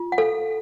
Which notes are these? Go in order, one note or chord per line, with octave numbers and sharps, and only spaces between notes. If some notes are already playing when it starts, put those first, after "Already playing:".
Already playing: F4
F#5
A4 F5